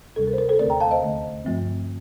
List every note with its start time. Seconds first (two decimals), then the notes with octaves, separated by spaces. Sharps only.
0.16 D2 C3 G3 A4
0.27 A#4
0.33 C5
0.38 A#4
0.49 A4 C5
0.59 D#2 D3 A3 C4 A#4 D5
0.70 G5 A#5
0.80 F5 A5
0.91 C5 D#5
1.03 D2 D3 A3
1.44 G2 F3 A3 C4